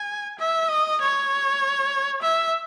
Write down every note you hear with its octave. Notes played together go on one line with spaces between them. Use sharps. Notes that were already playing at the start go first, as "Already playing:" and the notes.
Already playing: G#5
E5
D#5
C#5
E5